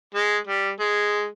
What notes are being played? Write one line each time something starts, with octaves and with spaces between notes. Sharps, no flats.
G#3
G3
G#3